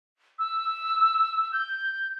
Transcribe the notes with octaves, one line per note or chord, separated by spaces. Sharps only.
E6
G6